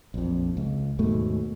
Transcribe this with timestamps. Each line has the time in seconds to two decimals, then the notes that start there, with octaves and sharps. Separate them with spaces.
0.14 A#1 F2
0.57 C#2
0.99 D#2 G#2 B2 A3